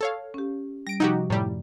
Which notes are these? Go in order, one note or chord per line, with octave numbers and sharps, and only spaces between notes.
A4 C#5 F5
C#4 G4
G3 A#6 D7
C3 F3 D#4 F#4 G4
F#2 A2 G3